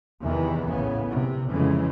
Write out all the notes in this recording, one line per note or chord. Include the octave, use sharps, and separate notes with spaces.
E2 C3 D#3 E3
A#1 A2 C#3 B3
C3
F2 C#3 E3 G#3